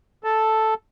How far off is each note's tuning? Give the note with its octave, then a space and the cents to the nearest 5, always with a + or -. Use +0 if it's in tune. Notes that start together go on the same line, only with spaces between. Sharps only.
A4 +0 A5 +0